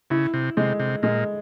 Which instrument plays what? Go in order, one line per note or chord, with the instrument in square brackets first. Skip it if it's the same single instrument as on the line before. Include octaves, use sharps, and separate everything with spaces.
[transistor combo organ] C#3 [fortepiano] E4
[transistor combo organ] C3
[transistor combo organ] C3 [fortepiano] G#3
[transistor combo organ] C3
[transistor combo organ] A#2 [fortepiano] G#3